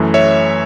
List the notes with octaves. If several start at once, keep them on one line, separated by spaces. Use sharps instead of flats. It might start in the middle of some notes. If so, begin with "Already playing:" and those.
Already playing: F#2 E3 A3
C#5 E5